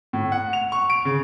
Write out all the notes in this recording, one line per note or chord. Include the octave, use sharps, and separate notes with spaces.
A2
F#5
F7
C#6
D7
C#3